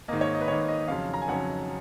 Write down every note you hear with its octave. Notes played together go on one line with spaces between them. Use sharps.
G#2 D#3 A#3 D#5
C#5
D#5
B4
G#2 D#3 A#3 C#5
D#5
F2 C#3 F#3 C#4 F5
A#5
G#5
F2 C#3 F#3 C#4 F#5